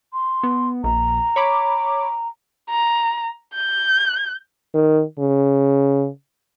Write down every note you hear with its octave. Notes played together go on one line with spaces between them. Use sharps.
C6
B3
A#1 A#5
C#5 B5 D6
A#5
G6
D#3
C#3